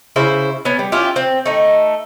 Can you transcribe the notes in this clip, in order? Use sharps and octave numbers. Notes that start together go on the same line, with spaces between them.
C#3 E4 C5
B3 C#4
G3
C#4 E4 F4 G4
C4
A3 D#4